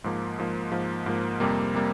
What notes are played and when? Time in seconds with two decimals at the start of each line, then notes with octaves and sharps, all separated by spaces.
0.04 G#2 F3 A#3
0.39 G#2 F3 A#3
0.72 G#2 F3 A#3
1.06 G#2 F3 A#3
1.40 F2 C3 G3 A#3
1.75 C3 G3 A#3